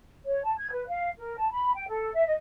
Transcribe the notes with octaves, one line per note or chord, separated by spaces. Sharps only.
C#5
A5
G#6
B4
F5
A#4
A5
B5
G5
A4
E5
D#5